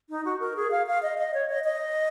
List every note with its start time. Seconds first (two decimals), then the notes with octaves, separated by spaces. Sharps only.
0.09 D#4
0.25 F#4
0.40 A#4
0.56 G#4
0.71 F5
0.87 F5
1.03 D#5
1.18 D#5
1.34 C#5
1.49 D#5
1.64 D#5